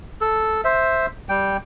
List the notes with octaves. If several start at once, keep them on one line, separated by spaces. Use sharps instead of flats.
A4
C5 E5
G3 G5